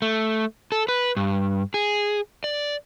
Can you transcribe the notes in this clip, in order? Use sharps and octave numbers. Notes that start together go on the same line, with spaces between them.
A3
A4
B4
G2
G#4
D5